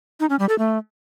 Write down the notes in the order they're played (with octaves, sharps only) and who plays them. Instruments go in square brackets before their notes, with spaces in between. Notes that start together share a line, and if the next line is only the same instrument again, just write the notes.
[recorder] D#4
C#4
G3
A4
A3